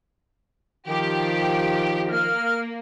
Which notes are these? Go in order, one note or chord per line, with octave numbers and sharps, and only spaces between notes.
D#3 F3 G4
A#3 F6